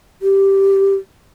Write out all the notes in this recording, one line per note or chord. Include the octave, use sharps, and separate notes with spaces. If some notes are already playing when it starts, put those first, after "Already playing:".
G4